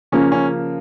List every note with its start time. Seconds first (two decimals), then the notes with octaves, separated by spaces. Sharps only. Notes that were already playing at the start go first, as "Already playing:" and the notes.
0.12 C#3 F3 A#3 C#4
0.32 C#4